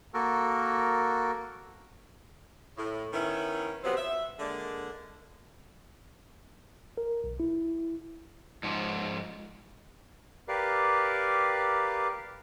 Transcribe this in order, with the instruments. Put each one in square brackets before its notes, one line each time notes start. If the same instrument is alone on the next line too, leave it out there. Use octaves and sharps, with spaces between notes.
[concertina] A#3 F#4 A4 A#4
[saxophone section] A2
D#3 B3 C#4 E4
C3 F3 F#3 B3 C4
E5
D3 G#3 A#3 D4
[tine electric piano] A#4
B1
E4
[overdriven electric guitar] G#2 F3
[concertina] G4 A#4 B4 D5 F5